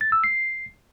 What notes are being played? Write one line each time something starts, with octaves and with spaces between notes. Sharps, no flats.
A6
E6
C7